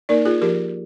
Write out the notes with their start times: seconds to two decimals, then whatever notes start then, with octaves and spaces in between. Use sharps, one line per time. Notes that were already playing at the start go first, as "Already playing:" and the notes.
0.09 A#3 D#4 A#4 D5
0.25 F4 G#4
0.41 F3 G4 A#4